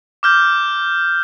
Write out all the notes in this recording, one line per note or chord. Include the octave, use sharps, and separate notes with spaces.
D6 F6 G6